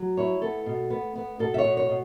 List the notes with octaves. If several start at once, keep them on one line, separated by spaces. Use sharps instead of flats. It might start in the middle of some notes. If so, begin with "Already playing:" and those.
Already playing: F#3
E4 C#5
B3 A4
B2
B3
B3
B2 A4
E5
C#5
B2
C#5
B2